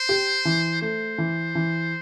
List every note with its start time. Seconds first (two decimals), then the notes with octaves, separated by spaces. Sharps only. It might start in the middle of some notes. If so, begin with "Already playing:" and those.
Already playing: C5
0.09 G4
0.45 E3
0.82 A3 C5
1.18 E3
1.55 E3